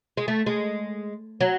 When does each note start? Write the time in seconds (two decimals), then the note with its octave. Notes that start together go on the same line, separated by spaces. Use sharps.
0.17 G#3
0.28 A3
0.46 G#3
1.41 F#3